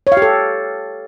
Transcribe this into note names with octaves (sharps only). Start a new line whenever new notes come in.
C#5
F5
G4
A4